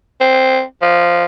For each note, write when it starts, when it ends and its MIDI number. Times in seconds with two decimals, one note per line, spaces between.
0.21 0.61 60
0.82 1.25 53